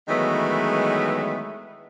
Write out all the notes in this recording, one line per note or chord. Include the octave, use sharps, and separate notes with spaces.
D#3 E3 F#3 G#3 A3 B3